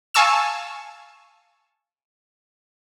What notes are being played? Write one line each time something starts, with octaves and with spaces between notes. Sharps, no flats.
F5 G#5 A5 C#6 E6 E7